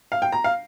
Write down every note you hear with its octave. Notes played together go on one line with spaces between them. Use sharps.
F5
G5
A#5
F5